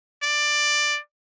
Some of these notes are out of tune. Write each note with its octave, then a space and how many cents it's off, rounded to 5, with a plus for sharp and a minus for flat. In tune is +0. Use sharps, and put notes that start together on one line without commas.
D5 +15